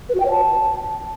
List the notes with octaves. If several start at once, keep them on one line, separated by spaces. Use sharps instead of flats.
B4
F#4
G5
C#5
A5